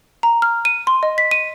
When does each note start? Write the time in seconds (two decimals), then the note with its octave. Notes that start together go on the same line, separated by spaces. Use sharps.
0.23 A#5
0.42 F6
0.65 D#7
0.87 C6
1.03 D#5
1.18 B6
1.31 D#7